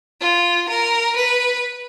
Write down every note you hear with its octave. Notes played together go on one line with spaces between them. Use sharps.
F4
A#4
B4